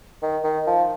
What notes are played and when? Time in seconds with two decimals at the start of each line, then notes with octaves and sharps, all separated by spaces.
0.23 D#3
0.44 D#3
0.67 F3